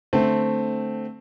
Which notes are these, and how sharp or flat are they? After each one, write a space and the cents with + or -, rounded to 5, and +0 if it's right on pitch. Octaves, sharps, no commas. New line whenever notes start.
D3 +10 A3 +0 C4 +0